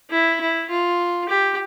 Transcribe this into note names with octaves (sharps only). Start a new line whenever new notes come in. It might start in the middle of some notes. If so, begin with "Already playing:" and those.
E4
E4
F4
G4